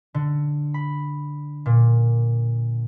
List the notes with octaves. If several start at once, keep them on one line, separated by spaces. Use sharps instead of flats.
D3
B5
A#2